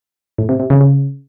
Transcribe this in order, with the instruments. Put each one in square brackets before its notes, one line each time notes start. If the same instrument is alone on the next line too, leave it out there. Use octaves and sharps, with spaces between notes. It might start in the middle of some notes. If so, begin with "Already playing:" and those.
[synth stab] A2
C3
C3
C#3
C#3